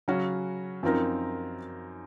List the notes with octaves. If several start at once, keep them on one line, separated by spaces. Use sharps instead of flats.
C#3 F#3 C#4 F#4
F#2 F3 C4 D#4 A#4